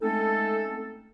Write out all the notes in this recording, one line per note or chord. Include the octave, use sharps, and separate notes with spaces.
G#3 A3 C4 C#4 D#4 A4